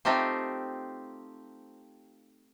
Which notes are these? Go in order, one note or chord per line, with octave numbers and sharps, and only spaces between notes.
A3 C4 D#4 F4 G4 C5